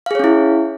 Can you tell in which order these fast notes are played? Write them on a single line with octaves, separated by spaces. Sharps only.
F5 G#4 C#5 C#4 E4